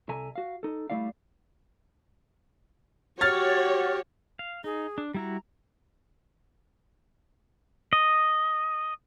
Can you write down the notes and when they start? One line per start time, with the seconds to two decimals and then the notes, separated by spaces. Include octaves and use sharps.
0.09 C2 A4 E5 G#5 A#5
0.36 F#4 F5
0.63 D#4 A4
0.90 G3 A3 E4 D5 F5
3.21 F#4 G4 C#5 F6 A6
4.39 F5
4.64 D#4 G#4
4.98 D4
5.14 G3 E4 F#4 A#5
7.93 D#5